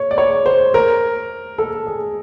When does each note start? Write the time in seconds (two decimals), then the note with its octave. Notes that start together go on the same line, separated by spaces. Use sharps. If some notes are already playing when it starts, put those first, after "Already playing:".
Already playing: C#5
0.11 D5
0.18 C#5
0.46 C5
0.74 A#4
1.58 A4
1.86 G#4